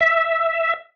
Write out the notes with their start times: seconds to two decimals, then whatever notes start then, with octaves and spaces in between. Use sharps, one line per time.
0.01 E5